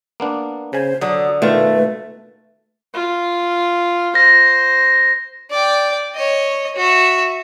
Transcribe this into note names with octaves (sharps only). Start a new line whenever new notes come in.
A#3 B3 D4
C#3 C5 G#5
D3 F#3 D#6
B2 D#3 A3 F4 B4
F4
C5 A#6
D5 G5
C#5 D#5
F#4 E5